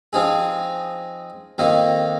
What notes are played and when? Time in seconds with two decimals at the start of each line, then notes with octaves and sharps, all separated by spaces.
0.13 F3 C4 D#4 G#4
1.58 F2 D#3 A#3 D#4